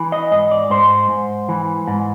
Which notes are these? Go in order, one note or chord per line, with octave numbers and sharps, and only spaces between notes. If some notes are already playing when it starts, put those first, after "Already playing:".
Already playing: E3
D#5
G#2 D#5
D5
G#2 C5
G#2
E3
G#2